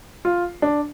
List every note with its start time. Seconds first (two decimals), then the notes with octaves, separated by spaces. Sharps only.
0.25 F4
0.62 D4